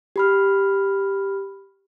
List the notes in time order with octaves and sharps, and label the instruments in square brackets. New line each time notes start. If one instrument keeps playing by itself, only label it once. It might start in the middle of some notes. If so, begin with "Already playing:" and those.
[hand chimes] G4 B5 F6